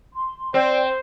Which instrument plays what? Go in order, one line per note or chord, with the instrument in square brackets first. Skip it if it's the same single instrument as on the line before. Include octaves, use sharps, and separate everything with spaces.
[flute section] C6
[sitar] C4 [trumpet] C5 [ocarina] D5 [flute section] G5